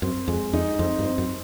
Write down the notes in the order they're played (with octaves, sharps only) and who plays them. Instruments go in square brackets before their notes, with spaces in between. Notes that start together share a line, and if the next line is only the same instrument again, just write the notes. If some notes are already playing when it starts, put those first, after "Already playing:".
[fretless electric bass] F#2 [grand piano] C4
[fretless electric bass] F2 [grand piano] G#3
[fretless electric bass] F2 [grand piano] D#4
[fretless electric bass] F2 [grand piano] C4
[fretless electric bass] G2
[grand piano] C4
[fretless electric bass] F#2